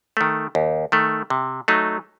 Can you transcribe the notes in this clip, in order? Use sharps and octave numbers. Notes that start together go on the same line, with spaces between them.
D#3 A3
D#2
D#3 A3
C3
F#3 A3 D#4